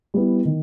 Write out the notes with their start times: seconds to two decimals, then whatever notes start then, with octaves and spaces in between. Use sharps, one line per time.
0.14 G3 B3 E4
0.45 D#3